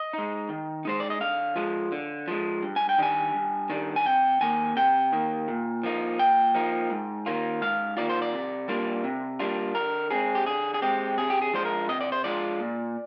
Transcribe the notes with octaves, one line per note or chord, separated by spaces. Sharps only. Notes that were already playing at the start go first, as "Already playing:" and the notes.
Already playing: D#5
G#3 D#4
D#3
G#3 D#4 C5
D5
D#5
D3 F5
F3 G#3
D3
F3 G#3
G2
G#5
G5
D#3 G3 D4 G#5
G2
D#3 G3 D4
G#5
C3 G5
D#3 A#3 G#5
C3 G5
D#3 A#3
A#2
F3 A#3 D#4
A#2 G5
F3 A#3 D#4
G#2
D#3 A#3 F4
G#2 F5
D#3 A#3 F4 D5
C5
D5
C3
G3 A#3 D4 F4
C3
G3 A#3 D4 F4
D3 A#4
G#3 C4 G#4
G4
D3 G#4
G#4
G#3 C4 G4
C3 G#4
G4
G#4
F3 G#3 D4 F4 C5
A#4
C3 D#5
D5
C5
F3 G#3 D4 F4 D5
A#2